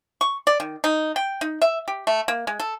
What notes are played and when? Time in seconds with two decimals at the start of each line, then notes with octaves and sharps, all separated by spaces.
0.21 C#6
0.47 D5
0.60 D#3
0.84 D#4
1.16 G5
1.41 D#4
1.62 E5
1.88 G4
2.07 A3
2.28 A#3
2.47 G#3
2.60 A4